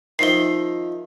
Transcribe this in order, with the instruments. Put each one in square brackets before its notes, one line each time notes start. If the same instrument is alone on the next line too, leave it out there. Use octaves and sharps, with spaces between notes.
[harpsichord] D#3 F3 E5 [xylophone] C7 G7